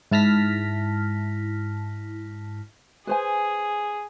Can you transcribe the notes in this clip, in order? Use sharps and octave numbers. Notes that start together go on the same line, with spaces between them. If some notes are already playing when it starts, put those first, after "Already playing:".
G#2 E4 A5 F6 A#6 B6
G#4 B4 C5 G#5